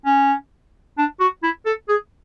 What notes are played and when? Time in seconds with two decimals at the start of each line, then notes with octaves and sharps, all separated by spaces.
0.05 C#4
0.98 D4
1.20 F#4
1.43 E4
1.66 A4
1.88 G#4